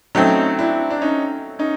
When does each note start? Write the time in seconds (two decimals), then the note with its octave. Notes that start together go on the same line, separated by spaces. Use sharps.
0.15 F#3 A3 C4 C#4 D#4
0.59 D4 E4
0.90 D4
1.01 C#4 D#4
1.59 C#4 D#4